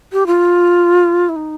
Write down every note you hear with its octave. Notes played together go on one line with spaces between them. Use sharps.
G4
F4
E4
D#4